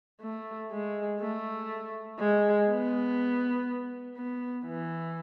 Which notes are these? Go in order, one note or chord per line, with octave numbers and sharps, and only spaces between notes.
A3
G#3
A3
G#3
B3
B3
E3